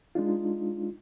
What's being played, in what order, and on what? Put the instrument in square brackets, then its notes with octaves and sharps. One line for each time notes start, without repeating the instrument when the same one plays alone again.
[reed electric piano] G#3 D4 D#4 F4